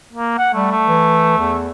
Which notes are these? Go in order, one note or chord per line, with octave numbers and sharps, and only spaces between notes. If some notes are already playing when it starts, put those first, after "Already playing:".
A#3
F#5
G3 A3
A3
E3
E2